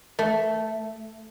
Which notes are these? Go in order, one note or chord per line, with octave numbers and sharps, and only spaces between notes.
A3